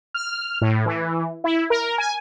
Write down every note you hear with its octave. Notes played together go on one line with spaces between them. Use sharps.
F6
A2
E3
E4
A#4
G#5